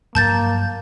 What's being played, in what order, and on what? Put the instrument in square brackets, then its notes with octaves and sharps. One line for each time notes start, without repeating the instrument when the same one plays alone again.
[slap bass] G2 F3 F#3 [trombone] A#3 [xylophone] A5 G6 A6